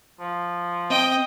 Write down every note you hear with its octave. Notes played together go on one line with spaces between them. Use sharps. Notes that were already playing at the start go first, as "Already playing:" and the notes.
F3
C4 D#5 G5